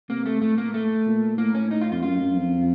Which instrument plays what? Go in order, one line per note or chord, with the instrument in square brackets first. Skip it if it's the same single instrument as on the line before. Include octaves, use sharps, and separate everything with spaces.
[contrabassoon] C3 [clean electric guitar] A#3
[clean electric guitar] A3
[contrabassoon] A2 [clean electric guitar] A3
[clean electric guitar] A#3
A3
[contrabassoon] A#2
[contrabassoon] A2 [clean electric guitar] A#3
[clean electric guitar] C#4
D#4
F4
[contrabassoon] F2 [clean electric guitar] F4
[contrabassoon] F#2 [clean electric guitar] F4
[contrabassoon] F#2
F2